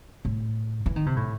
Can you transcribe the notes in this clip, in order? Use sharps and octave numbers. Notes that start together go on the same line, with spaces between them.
A2
E3
D#3
C3
A2